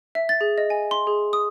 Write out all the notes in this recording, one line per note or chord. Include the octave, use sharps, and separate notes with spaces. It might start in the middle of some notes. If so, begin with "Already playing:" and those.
E5
A6
G#4
D#5
G#5
C6
G#4
D#6